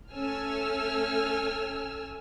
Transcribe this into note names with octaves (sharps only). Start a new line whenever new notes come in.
A3 C#4 A4 G#5 E6 F6